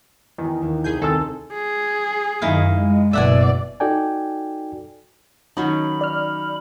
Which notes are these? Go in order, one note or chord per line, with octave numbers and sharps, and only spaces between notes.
E2 D#3
D#2
C2 G#4 G#5 G6
D#3 C4 A4 G#5 A5 E6 A6
G#4
F#2 D#3 D#4 E4 F5
G#3
F#1 B2 D5 E5 F#5 G#5
D#4 F#4 A4 D5 G5 G#5
D#3 F#3 C#4 D#4 B5
D5 F6